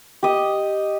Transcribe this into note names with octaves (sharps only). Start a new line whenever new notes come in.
G4 D#5